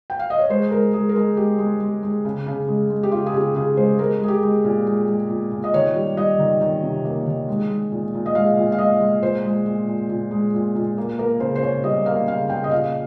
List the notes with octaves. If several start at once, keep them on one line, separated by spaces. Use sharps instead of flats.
G5
F5
D#5
C#5
G#3 C5
G#3 A#4
G#3 G#4
A#4
G#3 G#4
G#3 G4
G#3
G#3
G#3
C#3
C#3
G#3
G#3
G4
C#3 F4
G#4
C#3 G4
C#3 G#4
G#3 C5
G#3 A#4
G#3 G#4
G4
G#3
A#2
G#3
G#3
A#2
A#2
D#5
D#3 C#5
G3
G3 D#5
D#3
D#3
C3
A#3
D#3
G#3
G#3
A#2
A#2
D#5
G#3 F5
A#2
F5
G#3 D#5
G#3
A#2 C5
G#3
A#2
A#2
A#2
G#3
A#2
A#2
A#3
A#3 A#4
C#3 C5
C5
C#3 C#5
G3 D#5
A#3 F5
C#3 F5
C#3 G5
D#5
A#2 F5